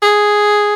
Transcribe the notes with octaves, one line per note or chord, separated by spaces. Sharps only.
G#4